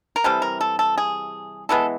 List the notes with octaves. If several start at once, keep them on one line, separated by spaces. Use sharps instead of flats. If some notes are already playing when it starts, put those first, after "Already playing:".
A#4
C3 E3 G3 A4
A#4
A4
A4
G#4
E3 G#3 B3 A4